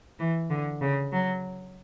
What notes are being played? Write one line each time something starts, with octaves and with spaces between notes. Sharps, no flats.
E3
D3
C#3
F#3